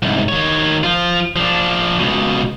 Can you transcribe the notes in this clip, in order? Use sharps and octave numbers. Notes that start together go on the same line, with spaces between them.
C2 G#2
D#3 C#5
F3 F4
F3 D4
C#2 B2